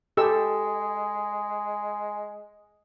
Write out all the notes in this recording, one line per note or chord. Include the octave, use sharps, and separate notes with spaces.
G#3 G4 A4 E6